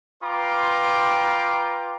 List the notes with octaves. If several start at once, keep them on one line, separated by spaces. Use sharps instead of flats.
F4 B4 G5 A#5 C6 D6